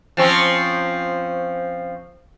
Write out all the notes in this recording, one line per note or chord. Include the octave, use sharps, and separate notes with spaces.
F3 C4 C#4